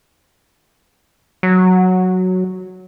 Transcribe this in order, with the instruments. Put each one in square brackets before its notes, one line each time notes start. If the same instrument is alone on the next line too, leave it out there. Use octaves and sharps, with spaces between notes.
[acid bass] F#3